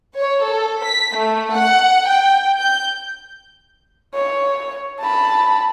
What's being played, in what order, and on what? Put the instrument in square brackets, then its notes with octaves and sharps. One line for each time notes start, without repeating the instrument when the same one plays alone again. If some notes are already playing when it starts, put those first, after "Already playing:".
[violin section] C#5
A4
B6
A3
F#5
G5
G6
[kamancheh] C#5
A5 B5